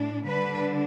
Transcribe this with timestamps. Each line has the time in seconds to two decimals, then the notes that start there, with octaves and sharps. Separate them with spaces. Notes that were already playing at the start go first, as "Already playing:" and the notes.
Already playing: A2 D4
0.26 D3 G3 D4 B4